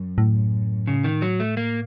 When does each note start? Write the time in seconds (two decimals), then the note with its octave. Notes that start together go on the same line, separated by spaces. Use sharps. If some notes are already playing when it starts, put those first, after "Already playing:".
Already playing: F#2
0.18 A2
0.87 C#3
1.04 D#3
1.22 F#3
1.40 A3
1.57 A#3